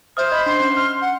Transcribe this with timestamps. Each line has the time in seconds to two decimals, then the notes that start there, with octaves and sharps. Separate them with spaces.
0.17 C5 E5 D#6 F6
0.32 D#5 B5
0.46 D4 C6
0.60 C#4
0.76 F6
1.01 F#5